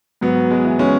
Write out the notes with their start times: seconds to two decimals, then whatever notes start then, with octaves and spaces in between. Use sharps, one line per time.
0.21 G#2 F#3 B3
0.51 G#3
0.65 E3
0.79 G#3 C#4